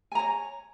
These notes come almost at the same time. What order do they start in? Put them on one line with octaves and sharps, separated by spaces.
G#5 A#5 C#5